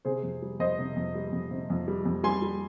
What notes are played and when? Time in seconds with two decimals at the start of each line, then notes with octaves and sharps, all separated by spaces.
0.05 C3 G#4 C5
0.23 F2
0.42 G3
0.59 F2 C5 D#5
0.79 C3
0.96 F2
1.15 G3
1.32 F2
1.51 C3
1.70 F2
1.88 G3
2.05 F2
2.24 G3 G#5 C6
2.42 G3